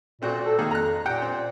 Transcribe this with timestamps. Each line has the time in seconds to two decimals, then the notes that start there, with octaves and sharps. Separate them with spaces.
0.22 A#2 A3 C4 F#4
0.46 A4
0.58 D#3 A#3 G#4 A4
0.71 F2 A#5 F#6
1.06 A#2 G4 F#5 G5
1.22 C4